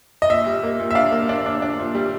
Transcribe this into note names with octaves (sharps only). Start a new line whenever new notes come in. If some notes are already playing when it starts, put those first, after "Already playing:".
D#5
A#2 E5
G3
A#3
A#2
E5
D4 F5
A#3
D4
D4
D4
A#2
G3